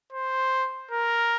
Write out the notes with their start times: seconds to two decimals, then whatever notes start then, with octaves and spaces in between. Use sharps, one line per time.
0.13 C5
0.91 A#4